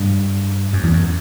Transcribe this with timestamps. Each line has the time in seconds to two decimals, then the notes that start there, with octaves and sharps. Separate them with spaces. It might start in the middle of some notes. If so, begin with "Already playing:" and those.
Already playing: G2
0.73 F#2
0.83 E2
0.93 F#2